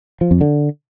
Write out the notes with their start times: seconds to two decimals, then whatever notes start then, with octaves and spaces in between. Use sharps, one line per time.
0.21 F3
0.31 F2
0.41 D3